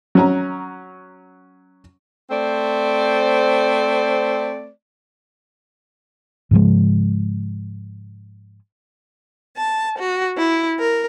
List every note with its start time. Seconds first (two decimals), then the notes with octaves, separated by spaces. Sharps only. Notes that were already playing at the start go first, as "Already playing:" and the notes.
0.15 F#3 C#4 A#5
2.30 A3 C4 C5 D5
6.51 G#2 C#3 F3 G#3
9.57 A5
9.97 F#4
10.37 E4
10.78 A#4